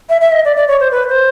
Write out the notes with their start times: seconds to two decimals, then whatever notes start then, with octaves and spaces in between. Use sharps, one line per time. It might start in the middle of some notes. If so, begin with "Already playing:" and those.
0.09 E5
0.21 E5
0.32 D#5
0.45 D5
0.57 D5
0.68 C#5
0.80 C5
0.91 B4
1.09 C5